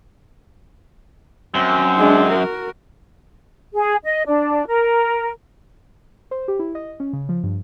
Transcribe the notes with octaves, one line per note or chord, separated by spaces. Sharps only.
F#2 C4
G#3 D4
F#4 A#4
G#4
D#5
D4
A#4
C5
G4
E4
D#5
C#4
C#3
F3
G2